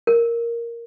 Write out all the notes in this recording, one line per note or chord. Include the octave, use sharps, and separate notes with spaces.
A#4